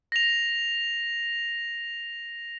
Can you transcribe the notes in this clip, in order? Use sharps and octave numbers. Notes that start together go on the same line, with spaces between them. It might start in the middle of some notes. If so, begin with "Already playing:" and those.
A#6 F7